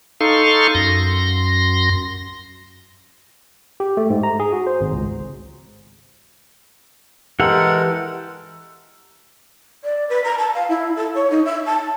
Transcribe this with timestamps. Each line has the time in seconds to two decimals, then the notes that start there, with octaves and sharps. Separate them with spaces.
0.21 D#4 A4 F5 C6 C#6
0.75 F#2 C6 A#6
3.80 G4
3.97 A3
4.10 G#2
4.23 A#5
4.40 G#4
4.52 F#4
4.67 C5
4.81 G#1
4.93 C#2
7.40 E3 G#3 G4 A4 A#4 F#5
9.83 D5
10.09 B4
10.23 A#5
10.37 A5
10.54 F5
10.68 E4
10.96 A4
11.14 C#5
11.30 D#4
11.44 E5
11.65 A5